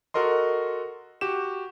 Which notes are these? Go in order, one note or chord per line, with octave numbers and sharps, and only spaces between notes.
F#4 A4 A#4 D#5 C6
F#4 G4 E7